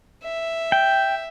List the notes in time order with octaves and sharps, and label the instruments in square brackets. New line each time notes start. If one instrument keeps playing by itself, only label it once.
[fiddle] E5
[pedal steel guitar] G5